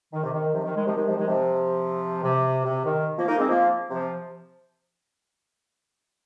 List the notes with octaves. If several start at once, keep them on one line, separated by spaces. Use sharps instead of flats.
D#3
C3
D#3
C3 F3
D#3
D#3 G#3
C3 F3
D#3 G#3
C3 F3
D#3 G#3
C3 F3
C3
C3
D#3
F3 A#3
A#3 D#4
G#3 C4
F3 A#3
C3 F3